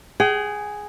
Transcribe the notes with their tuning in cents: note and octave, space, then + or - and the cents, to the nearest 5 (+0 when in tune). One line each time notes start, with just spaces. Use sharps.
G#4 +0 G5 -45